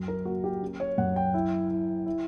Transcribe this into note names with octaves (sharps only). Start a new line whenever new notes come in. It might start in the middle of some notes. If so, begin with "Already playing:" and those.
Already playing: F#2 F#3
A#4
A#3 F#4
G4
C#4
C#5
F#2 F#5
G5
E4
E4
E4